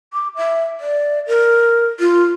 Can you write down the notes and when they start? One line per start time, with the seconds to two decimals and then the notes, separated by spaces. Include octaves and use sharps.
0.14 D6
0.36 E5
0.80 D5
1.27 A#4
2.00 F4